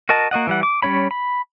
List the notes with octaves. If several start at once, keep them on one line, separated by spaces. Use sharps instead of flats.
F#4 A#4 D#5 A5
A#3 F#4 D#5 F#5
E3 G3 F#5
D6
G3 A#3 C#4 C#5 B5
B5